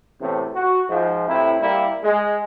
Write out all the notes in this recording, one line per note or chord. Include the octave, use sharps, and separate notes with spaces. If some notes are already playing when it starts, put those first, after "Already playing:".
E2 A2 C3
F#4
G#2 F3
A2 C3 E4
G3 A#3 E4
G#3